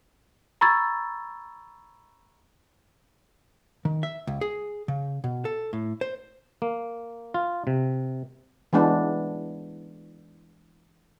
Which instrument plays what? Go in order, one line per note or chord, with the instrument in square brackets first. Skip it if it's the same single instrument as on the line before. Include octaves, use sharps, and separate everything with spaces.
[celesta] A#5 B5 C#6 E6 G#6 A6
[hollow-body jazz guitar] D#3
E5
C#2
G#4
C#3
B2
A4
A2
C5
[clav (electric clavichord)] A#3
F4
C3
[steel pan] E3 G#3 B3 D4